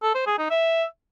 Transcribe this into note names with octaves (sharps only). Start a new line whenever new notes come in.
A4
C5
G#4
D#4
E5